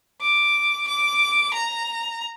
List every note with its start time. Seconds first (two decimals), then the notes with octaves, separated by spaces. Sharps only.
0.21 D6
0.88 D6
1.54 A#5